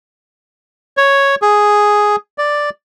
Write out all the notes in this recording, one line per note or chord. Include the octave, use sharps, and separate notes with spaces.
C#5
G#4
D5